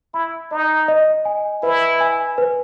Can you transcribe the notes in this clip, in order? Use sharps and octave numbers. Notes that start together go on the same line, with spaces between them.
E4 B5
D#4 D#5
D#5
G#5
E4 B4
G#5
B4